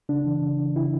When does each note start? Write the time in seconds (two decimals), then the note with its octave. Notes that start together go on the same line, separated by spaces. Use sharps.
0.09 C#3 D4
0.26 E3
0.42 C#3
0.60 E3
0.76 C#3 E4